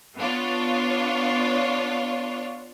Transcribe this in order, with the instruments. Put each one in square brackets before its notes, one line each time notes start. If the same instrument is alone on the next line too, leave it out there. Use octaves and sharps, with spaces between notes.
[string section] B3 D4 F4 C#5